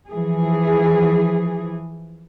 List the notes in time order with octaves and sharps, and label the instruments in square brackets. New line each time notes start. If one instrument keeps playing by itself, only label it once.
[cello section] E3 F3 G#4